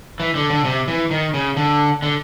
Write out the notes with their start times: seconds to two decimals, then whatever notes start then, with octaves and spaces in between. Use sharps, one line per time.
0.20 E3
0.35 D3
0.50 D3
0.65 C3
0.88 E3
1.11 D#3
1.34 C#3
1.57 D3
2.02 D3